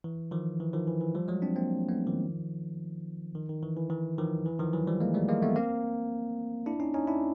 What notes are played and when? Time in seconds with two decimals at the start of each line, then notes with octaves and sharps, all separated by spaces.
0.04 E3
0.31 D#3 F3
0.60 E3
0.73 D#3 F3
0.87 E3
1.01 E3
1.15 F3 G3
1.28 F#3 G#3
1.42 C4 D4
1.56 A#3 C4
1.89 A3 B3
2.07 D#3 F3
3.35 D#3
3.49 D#3
3.63 E3
3.77 E3
3.90 E3
4.18 D#3 F3
4.46 E3
4.59 D#3 F3
4.73 E3 F#3
4.87 F3 G3
5.01 G#3 A#3
5.14 G3 A3
5.29 G#3 A#3
5.42 A3 B3
5.56 A#3 C4
6.66 D4 E4
6.80 C#4 D#4
6.94 C#4 D#4
7.07 D4 E4